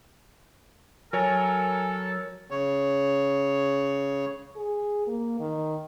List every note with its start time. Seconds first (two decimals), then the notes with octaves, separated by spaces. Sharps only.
1.13 F#3 A4 A#4 C#5 G#5
2.51 C#3 C#5
4.56 G#4
5.07 A#3
5.40 D#3